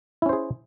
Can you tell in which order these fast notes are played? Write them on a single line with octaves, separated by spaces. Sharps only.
E4 C#4 C5 G#4